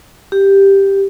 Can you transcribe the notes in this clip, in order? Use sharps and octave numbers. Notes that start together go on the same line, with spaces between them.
G4